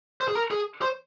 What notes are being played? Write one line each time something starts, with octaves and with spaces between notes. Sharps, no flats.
C5
G#4
A#4
G#4
C5